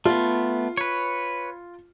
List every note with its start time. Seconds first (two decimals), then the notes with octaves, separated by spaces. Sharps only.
0.05 A3 B3 F4
0.77 B4 C#5